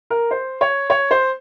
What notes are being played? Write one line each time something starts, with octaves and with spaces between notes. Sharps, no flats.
A#4
C5
C#5
C#5
C5